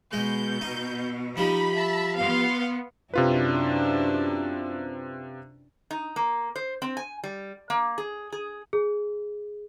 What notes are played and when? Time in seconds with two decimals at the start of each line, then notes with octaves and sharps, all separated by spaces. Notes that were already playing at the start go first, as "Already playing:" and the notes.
0.13 B2 G#3 G6
0.61 D#4
1.37 F3 G3 D#4 B5
1.73 E5 A5
2.16 B3 F5 C6
3.14 F#2 C3 D4 E4 F4 B4
5.91 D#4
6.16 A#3
6.56 C5
6.82 C4
6.97 G#5
7.24 G3
7.70 A#3
7.98 G#4
8.32 G#4
8.73 G#4